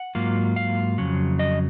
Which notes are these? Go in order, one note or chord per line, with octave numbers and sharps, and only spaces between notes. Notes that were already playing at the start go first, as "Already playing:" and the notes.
Already playing: F#5
G#2 F#3 A#3 F4
F5
F2 C#3 F#3
D#5